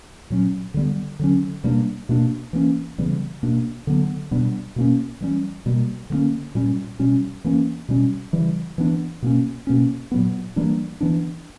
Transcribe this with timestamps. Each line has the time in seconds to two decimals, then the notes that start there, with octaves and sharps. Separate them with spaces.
0.30 A#2 F#3 C#4
0.74 D3 G3 B3
1.19 D3 F#3 C#4
1.64 B2 G3 A#3 D4
2.09 B2 A#3 D4
2.53 E3 A#3 C#4
2.98 C#3 E3 G3 B3
3.43 B2 A#3 D4
3.87 D3 F#3 B3
4.31 B2 G3 B3 D4
4.76 B2 A#3 C#4
5.21 E3 G3 C#4
5.66 B2 G3 A#3
6.10 D3 F#3 A#3 C#4
6.55 A#2 G3 C#4
6.99 B2 G3 C#4
7.44 E3 A#3 C#4
7.89 B2 G3 C#4
8.33 C#3 E3 G3
8.78 E3 B3 D4
9.22 B2 A#3 C#4
9.67 B2 A#3 C#4
10.12 A#2 F#3 B3
10.56 E3 G3 A#3 D4
11.01 E3 B3 D4